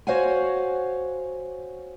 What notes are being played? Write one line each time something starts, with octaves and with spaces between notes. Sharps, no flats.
F#4 C5 C#5 F5 F#5 G#5